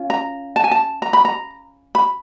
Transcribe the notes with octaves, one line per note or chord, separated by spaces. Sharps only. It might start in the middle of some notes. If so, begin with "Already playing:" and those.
Already playing: C#4 F4
A#5
A5
G#5
A5
A#5
B5
A#5
B5